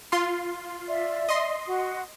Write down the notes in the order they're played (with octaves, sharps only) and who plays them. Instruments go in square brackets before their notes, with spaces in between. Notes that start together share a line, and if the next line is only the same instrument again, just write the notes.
[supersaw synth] F4 C6
[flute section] D5 E5
[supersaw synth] D#5 C6
[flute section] F#4